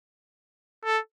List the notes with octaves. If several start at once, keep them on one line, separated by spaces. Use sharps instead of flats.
A4